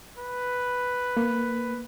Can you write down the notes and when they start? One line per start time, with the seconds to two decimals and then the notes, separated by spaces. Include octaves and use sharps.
0.18 B4
1.17 A#3